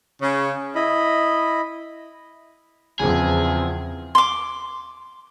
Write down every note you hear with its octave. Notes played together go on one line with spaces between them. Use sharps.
C#3
E4 D#5 B5
E2 C#3 F3 C4 G#4
C6 D6